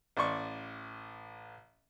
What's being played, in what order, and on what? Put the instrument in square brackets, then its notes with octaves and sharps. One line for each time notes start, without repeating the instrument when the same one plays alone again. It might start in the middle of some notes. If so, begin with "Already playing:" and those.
[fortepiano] A1 D5 C6 C#6